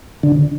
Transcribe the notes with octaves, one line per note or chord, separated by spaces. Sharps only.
D3